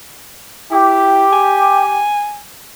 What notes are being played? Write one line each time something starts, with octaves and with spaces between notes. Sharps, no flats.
E4 G4
G#5